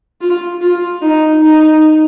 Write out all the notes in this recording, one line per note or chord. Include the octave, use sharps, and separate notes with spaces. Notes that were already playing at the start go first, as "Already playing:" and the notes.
F4
F4
D#4
D#4